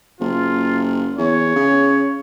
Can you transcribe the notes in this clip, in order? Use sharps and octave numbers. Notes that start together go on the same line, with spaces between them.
F#1 F4
E2 C#5
C#3